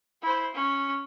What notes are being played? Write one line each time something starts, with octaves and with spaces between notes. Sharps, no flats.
E4 C5
C#4